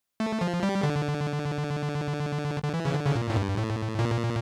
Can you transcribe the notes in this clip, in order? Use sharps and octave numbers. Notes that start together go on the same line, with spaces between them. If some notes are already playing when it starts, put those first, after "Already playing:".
A3
F3
G3
D3
D3
E3
C#3
D3
C#3
A#2
A2
G2
A2
A#2